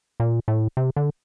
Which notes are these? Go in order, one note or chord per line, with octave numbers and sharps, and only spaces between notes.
A#2
A2
C3
D3